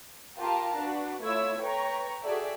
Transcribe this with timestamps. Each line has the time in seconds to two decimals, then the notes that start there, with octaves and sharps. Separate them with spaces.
0.39 F4 G4 A#4 F5 A5 A#5
0.78 D4 F#4 B4
1.23 A3 E4 F4 C#5 E6 G#6
1.60 B4 C#5 G5 A#5 C#6
2.23 F#4 G#4 A4 D5 E5 G5